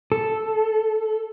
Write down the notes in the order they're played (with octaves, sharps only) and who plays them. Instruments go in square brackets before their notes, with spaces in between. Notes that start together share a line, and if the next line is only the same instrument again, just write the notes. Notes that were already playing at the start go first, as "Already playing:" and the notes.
[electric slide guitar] A4